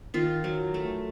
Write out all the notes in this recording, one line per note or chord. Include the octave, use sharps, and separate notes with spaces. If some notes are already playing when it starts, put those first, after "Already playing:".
D#3 F4
F#3
A3